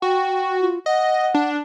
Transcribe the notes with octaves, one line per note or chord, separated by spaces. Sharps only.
F#4 G5
F4
D#5 F#5
D4